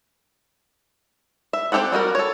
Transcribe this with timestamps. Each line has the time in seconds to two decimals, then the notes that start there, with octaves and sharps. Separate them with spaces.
1.53 E5
1.72 C4 D#4 G4 A4 F#5
1.92 G3 F#4 G#4 A#4
2.15 A4 C#5